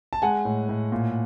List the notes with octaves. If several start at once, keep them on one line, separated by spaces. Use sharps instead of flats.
A5
G#3 F#5 G#5
A2
A2
A#2